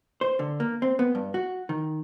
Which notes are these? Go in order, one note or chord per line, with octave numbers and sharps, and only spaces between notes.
C5
D3
A#3
C4
B3
G2
F#4
D#3